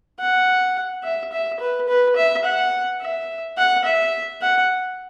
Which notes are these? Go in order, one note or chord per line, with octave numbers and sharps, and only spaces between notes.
F#5
E5
E5
B4
B4
E5
F#5
E5
F#5
E5
F#5